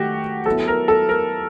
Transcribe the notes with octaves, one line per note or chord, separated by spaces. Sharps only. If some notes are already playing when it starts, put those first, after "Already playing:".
Already playing: D#3 A3 F#4 G4
F#3 B3 E4 A4
A#4
A4
A#4